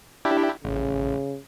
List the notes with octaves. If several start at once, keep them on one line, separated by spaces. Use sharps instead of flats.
D4 E4 G4
A1 C#3